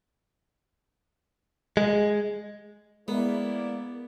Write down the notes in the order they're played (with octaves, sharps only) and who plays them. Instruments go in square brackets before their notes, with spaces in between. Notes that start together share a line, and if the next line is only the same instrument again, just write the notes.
[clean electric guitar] G#3
[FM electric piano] G#3 A#4 [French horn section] A#3 E4 D5 [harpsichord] B3